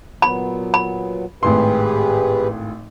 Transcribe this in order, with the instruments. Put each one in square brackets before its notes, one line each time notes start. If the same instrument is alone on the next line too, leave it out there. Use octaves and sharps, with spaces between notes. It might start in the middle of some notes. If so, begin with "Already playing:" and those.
[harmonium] A#2 F#3 B3 [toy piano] B5
[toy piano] B5
[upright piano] G#1 A2 C6 [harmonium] G4 G#4 B4